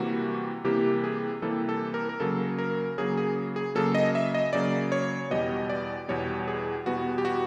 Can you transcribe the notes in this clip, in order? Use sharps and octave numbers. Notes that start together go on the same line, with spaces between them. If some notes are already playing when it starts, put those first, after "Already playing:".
Already playing: C3 E3 G3 A#3 F#4
C3 E3 G3 A#3 G4
G#4
C3 E3 G3 A#3 A4
A4
A#4
A#4
C#3 F#3 A#3 A4
A#4
C#3 F#3 A#3 G#4
G#4
G#4
C#3 F#3 A#3 A4
D#5
E5
D#5
C#3 F#3 A#3 D5
C#5
E2 B2 G3 B3 D#5
D5
E2 B2 G3 B3 C#5
G#4
E2 B2 G3 B3 F#4
G4
F#4